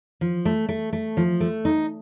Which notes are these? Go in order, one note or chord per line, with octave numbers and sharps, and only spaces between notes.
F3
A3
A3
A3
F3
A3
D#4